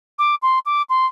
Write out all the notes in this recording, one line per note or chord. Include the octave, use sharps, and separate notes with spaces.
D6
C6
D6
C6